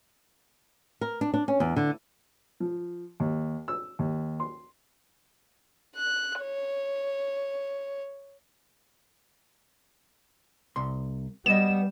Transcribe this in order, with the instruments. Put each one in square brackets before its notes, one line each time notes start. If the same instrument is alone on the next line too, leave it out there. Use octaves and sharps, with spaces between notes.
[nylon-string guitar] A#4
D4
D4
C#4
E2
D3
[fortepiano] F3
D#2
E6
D#2
C6
[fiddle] F#6
C#5
[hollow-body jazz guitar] C2 C6
[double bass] G3 [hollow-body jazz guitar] B3 D#5 [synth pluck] E7